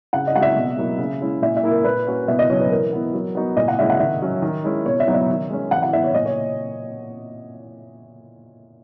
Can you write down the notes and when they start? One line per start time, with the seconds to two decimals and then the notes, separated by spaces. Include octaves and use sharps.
0.13 C#3 F#5
0.27 D#5
0.35 G#3 D#4 F#4 F#5
0.42 E5
0.56 B2
0.78 F#3 A#3 E4
0.99 C#3
1.21 G#3 C#4 E4
1.42 A#2 E5
1.57 E5
1.63 A#3 E4
1.71 A#4
1.84 A#2 B4
2.07 A#3 C#4 F#4
2.28 B2 E5
2.39 D#5
2.49 F#3 C#4 C#5
2.60 B4
2.70 E3 A#4
2.93 B3 E4
3.13 F#3
3.35 B3 D#4 F#4
3.57 A#2 D#5
3.68 F#5
3.79 G#3 C#4 E4 E5
3.90 F#5
3.99 D#3 E5
4.22 F#3 C#4
4.42 D#3
4.64 G#3 C#4 E4
4.86 B2 C#5
5.00 E5
5.07 F#3 B3 D#4 F#4
5.14 E5
5.29 D#3
5.50 G#3 C#4
5.71 E3 F#5
5.82 F#5
5.93 B3 E4 E5
6.04 C#5
6.14 A#2 D#5
6.26 C#5